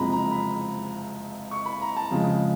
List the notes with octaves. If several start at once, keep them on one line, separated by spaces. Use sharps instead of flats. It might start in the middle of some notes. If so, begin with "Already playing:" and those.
Already playing: F#1 F2 C3 F3 G#3 A#5 B5
A#5
B5
C#6
B5
A#5
A5
F2 C#3 F3 G#3